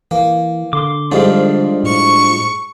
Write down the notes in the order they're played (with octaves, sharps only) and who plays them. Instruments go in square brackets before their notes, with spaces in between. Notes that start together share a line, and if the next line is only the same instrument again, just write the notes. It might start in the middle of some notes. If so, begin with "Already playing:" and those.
[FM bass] E3 [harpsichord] A#3
[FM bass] D3 [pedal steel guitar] C6 D6
[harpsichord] F2 G#2 G3 [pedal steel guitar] D4 F4
[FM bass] A2 [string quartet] C#6